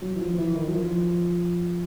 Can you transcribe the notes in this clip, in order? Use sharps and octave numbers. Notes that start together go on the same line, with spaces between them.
F#3
E3
F3
F3
E3
D#3
F#3
F3